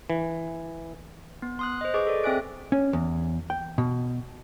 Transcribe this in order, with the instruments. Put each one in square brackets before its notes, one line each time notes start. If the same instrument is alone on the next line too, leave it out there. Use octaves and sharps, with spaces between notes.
[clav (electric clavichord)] E3
[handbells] B3
C6 D#6 F#6
C5 D#5
G#4 B4 D#5 C#6 D6
A4 D5 D6
C4 G#4 E5 G#5 F#6 D7
[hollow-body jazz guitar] C#4
E2
G5
B2